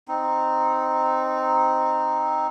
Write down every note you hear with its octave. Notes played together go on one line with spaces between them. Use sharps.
C4 D#4